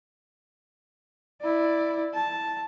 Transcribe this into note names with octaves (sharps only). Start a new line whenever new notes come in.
E4 D5
A5